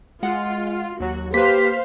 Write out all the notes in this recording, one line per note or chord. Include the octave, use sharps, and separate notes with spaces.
G#3 F4 F#5
D#2 F#3 F#4
A#3 G4 B4 C5 F5 B6